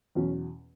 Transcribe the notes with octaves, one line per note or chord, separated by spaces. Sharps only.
E2 B2 F#3 C#4